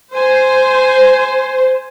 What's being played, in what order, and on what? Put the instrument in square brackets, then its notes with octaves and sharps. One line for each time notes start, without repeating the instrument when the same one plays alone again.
[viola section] C5 [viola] G#5